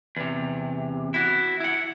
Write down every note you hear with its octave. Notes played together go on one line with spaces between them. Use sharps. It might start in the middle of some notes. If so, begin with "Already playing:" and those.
E2 C3
E4 F#4
E4 F#5